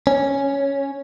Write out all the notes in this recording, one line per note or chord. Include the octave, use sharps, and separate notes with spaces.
C#4